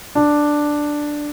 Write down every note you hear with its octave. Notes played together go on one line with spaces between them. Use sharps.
D4